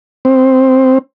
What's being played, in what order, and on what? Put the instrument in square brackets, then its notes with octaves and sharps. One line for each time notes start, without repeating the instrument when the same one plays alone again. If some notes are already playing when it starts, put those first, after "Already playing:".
[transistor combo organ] C4